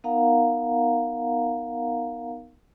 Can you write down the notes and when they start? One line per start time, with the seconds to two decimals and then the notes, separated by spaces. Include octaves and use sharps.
0.04 B3 D#4 A#4 F5 F#5 A#5